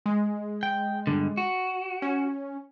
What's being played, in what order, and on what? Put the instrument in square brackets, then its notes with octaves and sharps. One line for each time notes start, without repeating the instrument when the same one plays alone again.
[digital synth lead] G#3
[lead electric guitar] G5
G2 D3
F#4
[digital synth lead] C#4